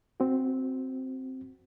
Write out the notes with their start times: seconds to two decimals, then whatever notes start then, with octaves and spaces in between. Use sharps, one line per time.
0.20 C4 F#4